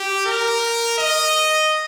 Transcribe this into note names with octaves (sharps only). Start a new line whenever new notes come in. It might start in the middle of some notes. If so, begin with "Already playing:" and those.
Already playing: G4
A#4
D#5